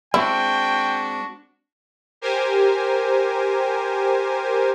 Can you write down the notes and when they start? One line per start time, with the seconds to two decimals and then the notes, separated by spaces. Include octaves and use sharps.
0.14 G#3 C4 D4 E4 F#4 G5 C#6
2.21 G4 A#4 C5 G#5